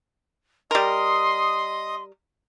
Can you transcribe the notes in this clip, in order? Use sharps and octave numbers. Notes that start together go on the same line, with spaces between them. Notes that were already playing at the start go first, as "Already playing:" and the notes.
G3 A#4 D#5 C6 D#6